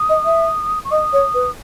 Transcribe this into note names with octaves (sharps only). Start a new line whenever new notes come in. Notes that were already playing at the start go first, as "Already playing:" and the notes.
Already playing: D#6
D#5
E5
C#6
D#5 D#6
C#5
B4